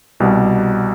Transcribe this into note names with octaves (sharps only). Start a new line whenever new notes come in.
C2 B2 G3